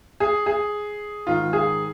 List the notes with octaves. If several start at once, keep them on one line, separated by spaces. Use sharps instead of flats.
G#4
G#4
G#2 D#3 F4
G#4